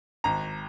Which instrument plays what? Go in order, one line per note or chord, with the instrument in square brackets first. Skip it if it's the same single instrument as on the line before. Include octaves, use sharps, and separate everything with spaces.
[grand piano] G#1 A#5